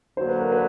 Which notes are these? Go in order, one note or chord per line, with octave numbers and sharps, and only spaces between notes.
D3 F#3 A#3 C5
B4
A#4
B4